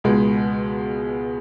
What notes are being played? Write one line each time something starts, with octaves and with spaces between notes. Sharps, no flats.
C#2 B2 G#3